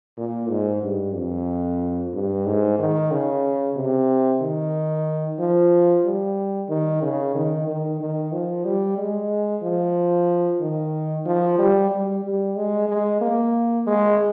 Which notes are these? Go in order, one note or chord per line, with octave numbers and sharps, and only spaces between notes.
A#2
G#2
G2
F2
G2
G#2
D#3
C#3
C3
D#3
F3
G3
D#3
C#3
D#3
D#3
D#3
F3
G3
G#3
F3
D#3
F3
G3
G3
G3
G#3
G#3
A#3
G#3